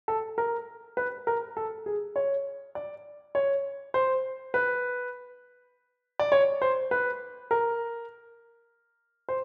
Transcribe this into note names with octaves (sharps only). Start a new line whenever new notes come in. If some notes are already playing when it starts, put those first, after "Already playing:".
A4
A#4
B4
A#4
A4
G#4
C#5
D5
C#5
C5
B4
D5
C#5
C5
B4
A#4
C5